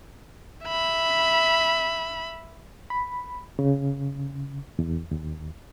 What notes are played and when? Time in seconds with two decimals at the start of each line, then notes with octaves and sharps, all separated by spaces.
0.65 E5 B5
2.90 B5
3.59 C#3
4.79 E2
5.11 D#2